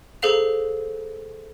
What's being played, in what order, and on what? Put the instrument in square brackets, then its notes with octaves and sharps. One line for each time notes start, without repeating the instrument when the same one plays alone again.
[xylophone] G#4 A4 C5 F5 F7